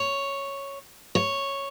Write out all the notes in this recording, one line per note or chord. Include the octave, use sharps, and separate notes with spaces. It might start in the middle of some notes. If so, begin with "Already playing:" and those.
Already playing: C#5
C#5